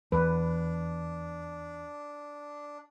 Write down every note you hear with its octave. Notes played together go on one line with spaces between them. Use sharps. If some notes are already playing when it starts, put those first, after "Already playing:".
E2 D4 B4